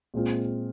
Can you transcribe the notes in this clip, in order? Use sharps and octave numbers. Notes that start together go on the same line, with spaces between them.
A#2 G#3 C4 F4